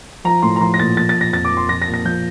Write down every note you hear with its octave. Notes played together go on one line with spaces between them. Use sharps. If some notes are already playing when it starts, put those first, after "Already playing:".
F3 A#5
A2 C6
A#5
F3 C6
A#6
A#2 A6
F3 A6
A6
A#2
A#6
F2 A6
D6
F3
C6
F3 A#6
A#6
A#2
A#6
F3 G6